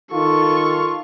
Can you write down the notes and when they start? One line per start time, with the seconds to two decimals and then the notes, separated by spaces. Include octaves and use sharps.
0.13 D#3 F4 A4 C#6